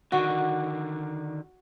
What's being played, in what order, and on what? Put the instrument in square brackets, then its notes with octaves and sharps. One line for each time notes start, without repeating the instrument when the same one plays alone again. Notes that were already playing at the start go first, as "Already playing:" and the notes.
[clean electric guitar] D3 D#3 [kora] F#4